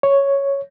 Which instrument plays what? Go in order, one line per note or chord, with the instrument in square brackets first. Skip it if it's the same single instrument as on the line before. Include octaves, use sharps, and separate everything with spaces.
[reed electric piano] C#5